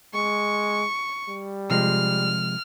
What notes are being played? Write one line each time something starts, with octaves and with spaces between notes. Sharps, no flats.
G#3 C#6
G3
C3 F3 G#3 F6